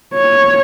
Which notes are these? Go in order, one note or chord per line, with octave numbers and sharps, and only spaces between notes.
C#5